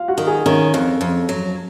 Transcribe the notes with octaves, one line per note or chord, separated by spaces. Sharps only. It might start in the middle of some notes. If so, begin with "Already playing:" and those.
Already playing: F4 F5
F#4 F#5
D#3
G#4 G#5
D#3 C#4 C#5
F2
F2
F#3